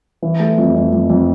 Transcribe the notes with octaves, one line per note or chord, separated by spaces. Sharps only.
E3
A3
F2
F2
F2
F2